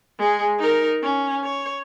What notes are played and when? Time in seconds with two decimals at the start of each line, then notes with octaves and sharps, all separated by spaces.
0.19 G#3 G#4
0.59 D#4 A#4
1.03 C#4
1.43 C#5